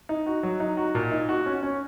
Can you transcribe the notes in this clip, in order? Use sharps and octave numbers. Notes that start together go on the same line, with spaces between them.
D#4
F#4
F#3
D#4
F#4
A#2
D#4
F#4
C#4
C#4